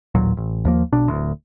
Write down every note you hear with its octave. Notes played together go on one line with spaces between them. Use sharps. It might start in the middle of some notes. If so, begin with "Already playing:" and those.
A1 D#2 A#2 F#3
A1
D#2 F3 A#3
B1 B2 D4
D1 D2